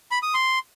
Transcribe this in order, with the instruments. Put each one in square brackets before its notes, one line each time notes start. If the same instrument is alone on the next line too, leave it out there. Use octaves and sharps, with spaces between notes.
[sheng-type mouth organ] B5
D#6
C6